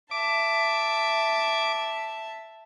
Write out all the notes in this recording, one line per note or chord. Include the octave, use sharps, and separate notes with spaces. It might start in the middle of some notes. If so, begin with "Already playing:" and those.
E5 A5 D6